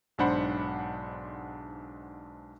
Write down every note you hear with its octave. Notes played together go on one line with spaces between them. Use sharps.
B1 G#2 D4 C5 F#5 B5